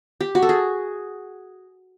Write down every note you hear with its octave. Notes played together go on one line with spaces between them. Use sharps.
G4
F#4
A4
G#4